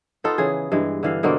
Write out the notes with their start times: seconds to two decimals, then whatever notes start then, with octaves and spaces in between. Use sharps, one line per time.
0.24 B3 D#4 F4 A4
0.38 C#3 E3 G#4
0.72 G2 E3 G#3
1.03 D3 E3 F5
1.23 B2 D3 A#3 C4